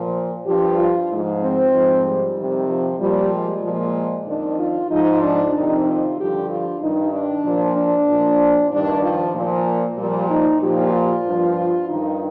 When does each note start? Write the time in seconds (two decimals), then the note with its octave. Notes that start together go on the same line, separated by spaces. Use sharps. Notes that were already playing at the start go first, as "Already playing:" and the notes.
Already playing: A#2 F3
0.47 G2 F3 G4
0.78 F4
1.10 G#2 F3
1.42 C4
1.73 G#2 F3
2.05 G3
2.37 F2 C3 D#3
2.69 F3
3.00 A#2 F3 G3
3.32 G#3
3.64 A#2 F3
4.27 F2 D#3 D4
4.59 F4
4.90 G#2 F3 D#4
5.22 D4
5.54 F2 C3 D#3 D#4
5.86 F4
6.17 G2 D3 F3 G4
6.49 F4
6.81 G2 D#3 D#4
7.12 D4
7.45 A#2 F3
7.76 D4
8.08 A#2 F3
8.71 G2 D#3 D4
9.02 F3
9.35 A#2 F3
9.98 A#2 F3 G3
10.30 D#4
10.61 A#2 F3 G4
10.93 F4
11.25 G2 F3
11.89 G2 D#3 D#4